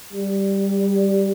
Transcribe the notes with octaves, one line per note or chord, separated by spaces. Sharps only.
G3